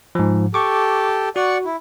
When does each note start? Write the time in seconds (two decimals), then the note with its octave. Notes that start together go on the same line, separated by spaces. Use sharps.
0.15 G#2 F3
0.54 G4 A4 C#6 D6
1.36 F#4 D5 F#5 C#6
1.65 E4